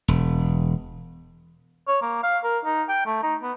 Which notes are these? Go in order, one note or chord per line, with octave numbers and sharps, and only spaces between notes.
E1
C#5
A#3
F5
A#4
D#4
G5
A3
D#4
B3